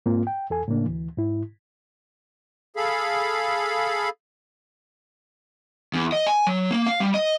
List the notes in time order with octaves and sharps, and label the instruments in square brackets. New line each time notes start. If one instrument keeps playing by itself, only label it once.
[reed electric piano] G#2 A#3 C4 F4
G5
E2 A4 G#5
A2 C#3 A#3 D4
D2 E3
G#2 E4
[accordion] G#4 A4 F5 B5
[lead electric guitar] E2
D#5
G#5
F#3
A#3
F5
G3
D#5